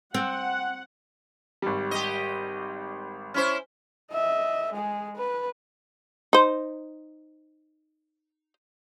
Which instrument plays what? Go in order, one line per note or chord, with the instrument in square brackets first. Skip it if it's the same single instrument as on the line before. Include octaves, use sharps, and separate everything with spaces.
[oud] C4 [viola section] F#5
[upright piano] G#1 G3
[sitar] G4 D#5
C#4 E4 C5
[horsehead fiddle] D#5 E5
G#3 G#4
B4
[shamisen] D#4 C5